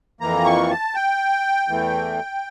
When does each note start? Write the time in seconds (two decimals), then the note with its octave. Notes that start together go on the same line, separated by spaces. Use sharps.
0.21 F2 E3 A#3 A#5
0.45 C#6
0.70 A5
0.95 G5
1.68 E2 E3 A3